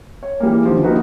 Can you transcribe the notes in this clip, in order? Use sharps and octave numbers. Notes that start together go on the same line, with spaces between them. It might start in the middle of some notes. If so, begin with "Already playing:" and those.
C#5
E3 G3 G#3 A#3
D3 D#3 F3
A#3 D#4 F#4 G4 B4